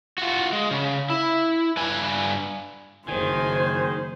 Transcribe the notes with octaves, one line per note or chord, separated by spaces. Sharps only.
F4 F#4
G#3
C#3
E4
G2 B4 G#5
F#1 D#3 C5 G#5